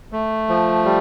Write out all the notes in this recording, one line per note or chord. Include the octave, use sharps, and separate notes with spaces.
A3
F3
G3